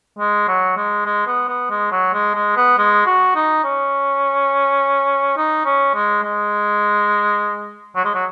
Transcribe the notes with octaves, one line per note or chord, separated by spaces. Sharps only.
G#3
F#3
G#3
G#3
B3
B3
G#3
F#3
G#3
G#3
B3
G#3
F#4
D#4
C#4
D#4
C#4
G#3
G#3
F#3
G#3
F#3